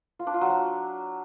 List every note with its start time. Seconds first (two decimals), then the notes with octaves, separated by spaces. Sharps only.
0.19 F4
0.27 D4
0.34 F4
0.41 F#3